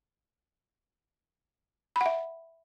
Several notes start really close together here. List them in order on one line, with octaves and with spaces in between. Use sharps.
B5 F#5 E5